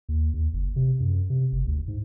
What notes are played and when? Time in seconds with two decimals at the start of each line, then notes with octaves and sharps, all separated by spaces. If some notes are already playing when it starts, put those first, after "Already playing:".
0.09 D#2
0.34 D#2
0.54 F#1
0.76 C3
1.00 F#2
1.30 C3
1.52 F#1
1.67 D2
1.88 G#2